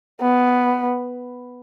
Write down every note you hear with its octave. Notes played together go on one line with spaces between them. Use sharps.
B3